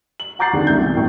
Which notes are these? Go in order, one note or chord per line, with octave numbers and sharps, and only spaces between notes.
F#7
F#5 A#5 D6 G6 A6 C7
D3 D#3 C4 G4 G#4
C2 G6
B2 E3
F#2 A2 G5 C#6